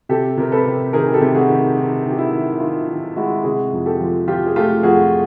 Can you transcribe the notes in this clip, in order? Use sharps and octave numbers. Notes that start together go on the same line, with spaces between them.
C3 G4 A4
C3 A#4
A4 B4
C3
D#3 G#4 A#4
G#4
G4 A4
C3
F#4 G#4
D#3
D#3
D#3
G4
E4 F#4
D#3
D#3 F4
D#3
G#3 E4 F#4
C3 F#4 G#4
F2
G4 A4
F3
F3 F4 G4
G#4
A3 F4 G4
F2 F#4 G#4